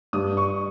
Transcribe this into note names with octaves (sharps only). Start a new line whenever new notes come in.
G2 G3 D#6
C#6